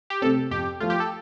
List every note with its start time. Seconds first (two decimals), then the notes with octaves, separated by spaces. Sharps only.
0.10 G4
0.22 C3 A3 C4 A4
0.51 F2 G4
0.80 F3 A3 F4
0.90 G4
1.00 A4